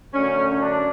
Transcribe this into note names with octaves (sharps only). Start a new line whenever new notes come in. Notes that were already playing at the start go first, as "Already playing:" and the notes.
F#2 D3 A3 C#4
D4